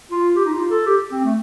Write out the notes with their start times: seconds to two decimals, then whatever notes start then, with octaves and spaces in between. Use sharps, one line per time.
0.11 F4
0.36 G4
0.45 D#4
0.53 F4
0.70 A4
0.86 G4
1.11 C4
1.24 A3